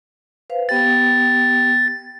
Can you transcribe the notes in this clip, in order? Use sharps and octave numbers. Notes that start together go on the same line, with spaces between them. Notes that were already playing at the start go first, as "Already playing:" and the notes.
B4 C5 F5
B3 G4 G5 A6